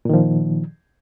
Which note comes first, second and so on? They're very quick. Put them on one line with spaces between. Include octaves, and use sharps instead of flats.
A#2 D#3 F3